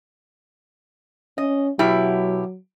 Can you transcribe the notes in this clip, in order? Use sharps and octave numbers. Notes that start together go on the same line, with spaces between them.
C#4 D#5
B2 F#3 E4 G4